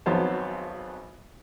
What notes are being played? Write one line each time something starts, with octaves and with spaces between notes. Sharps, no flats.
G#1 F2 F#3 B3 C5 A5